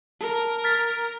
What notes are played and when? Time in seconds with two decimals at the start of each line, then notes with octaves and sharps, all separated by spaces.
0.21 A#4 A5
0.64 F6 A6 B6